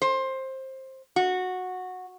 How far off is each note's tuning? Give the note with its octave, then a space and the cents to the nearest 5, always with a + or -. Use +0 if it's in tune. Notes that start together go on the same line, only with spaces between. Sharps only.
C5 +15
F#4 -10